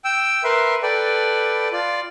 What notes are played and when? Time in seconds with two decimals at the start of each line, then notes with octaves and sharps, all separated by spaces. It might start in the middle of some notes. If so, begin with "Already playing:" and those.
0.05 G5 E6
0.44 A#4 B4 E5 C6
0.83 A4 B4 D5 G5
1.72 F4 D5